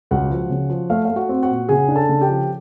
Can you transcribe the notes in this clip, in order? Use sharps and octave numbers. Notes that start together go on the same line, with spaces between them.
C#2 F#4 F#5
F3
C#3
F3
A3 F5
A3 F5
F#4 F#5
C4
F#4 F#5
A#2
C#3 G#4 G#5
D4
A4 A5
C#3
G4 G5
F3